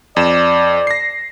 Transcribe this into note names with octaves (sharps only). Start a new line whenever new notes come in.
F2 D5 E7
A#6 C7